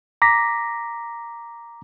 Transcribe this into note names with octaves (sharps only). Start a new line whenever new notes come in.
A#5 D6 A#6 B6